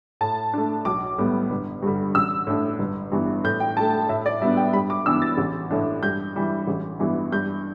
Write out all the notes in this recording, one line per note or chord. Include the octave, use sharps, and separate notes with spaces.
A2 A5
A3 D4
B1 D6
A2 G3 B3
G1
G2 D3 G3
A1 E6
A2 A3 D4
G1
G2 E3 B3
A2 G6
G5
A3 D4 A5
G5
A2 E5
D5
G3 B3 D4 E5
G5
G2 B5
D6
E3 B3 D4 E6
A6
A1
A2 E3 A3 D4
G2 G6
E3 G3 E4
A1
G2 E3 B3 E4
G2 G6